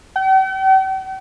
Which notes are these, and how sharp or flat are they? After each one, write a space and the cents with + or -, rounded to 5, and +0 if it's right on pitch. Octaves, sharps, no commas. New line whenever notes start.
G5 -45